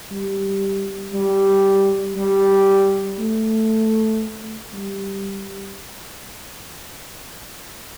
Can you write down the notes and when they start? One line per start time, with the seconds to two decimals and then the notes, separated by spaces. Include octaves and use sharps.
0.11 G3
1.13 G3
2.16 G3
3.19 A3
4.73 G3